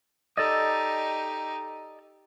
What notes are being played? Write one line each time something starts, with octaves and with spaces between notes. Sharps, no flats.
D#4 G4 A4 D5 D#5